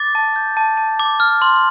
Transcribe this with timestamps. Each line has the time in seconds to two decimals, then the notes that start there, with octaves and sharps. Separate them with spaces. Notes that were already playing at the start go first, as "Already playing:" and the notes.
Already playing: D6 A6
0.15 A5
0.36 G6
0.57 A5
0.77 A5
1.00 D6
1.20 F6
1.42 C6